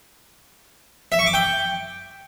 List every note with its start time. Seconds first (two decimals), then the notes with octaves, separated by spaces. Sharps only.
1.12 E5
1.19 C#6
1.26 D6
1.34 G5